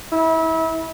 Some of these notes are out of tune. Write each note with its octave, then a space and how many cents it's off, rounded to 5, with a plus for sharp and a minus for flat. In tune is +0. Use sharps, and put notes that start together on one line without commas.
E4 -30